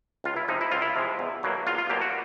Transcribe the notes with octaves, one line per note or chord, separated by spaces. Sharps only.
C#2 F4
E4
C3 F3 G#3 D#4
E4
C#2 F4
E4
C3 F3 G#3
E2
B2 F#3 A#3
E2 F4
F4
B2 F#3 A#3 G4
F#4